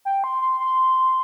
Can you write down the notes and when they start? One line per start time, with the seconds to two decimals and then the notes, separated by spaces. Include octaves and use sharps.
0.05 G5
0.24 C6
0.42 C6
0.60 C6